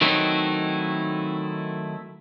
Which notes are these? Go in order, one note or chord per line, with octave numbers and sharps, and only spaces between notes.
D#3 F#3 A3 C4 D#4 E4